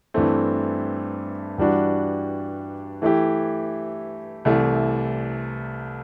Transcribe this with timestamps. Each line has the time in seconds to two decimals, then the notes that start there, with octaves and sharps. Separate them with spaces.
0.14 G2 E3 A3 C4
1.58 G2 E3 G3 D4 F#4
3.02 E3 A3 E4 G4
4.45 C2 C3 E3 A3